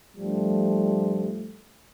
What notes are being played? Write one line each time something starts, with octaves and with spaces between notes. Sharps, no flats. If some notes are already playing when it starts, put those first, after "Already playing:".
G2 F3 G3 A3